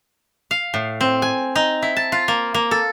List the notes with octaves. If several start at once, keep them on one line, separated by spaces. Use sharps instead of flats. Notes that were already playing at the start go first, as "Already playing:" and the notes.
F5
A2
C4
G#5
D#4
E4
A5
F4
A#3
A#3
A4